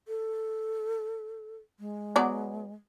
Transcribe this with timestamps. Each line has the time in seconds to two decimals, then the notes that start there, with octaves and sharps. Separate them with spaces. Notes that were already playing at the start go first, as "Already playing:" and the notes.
0.08 A4
1.80 G#3
2.16 F#3 B3 D5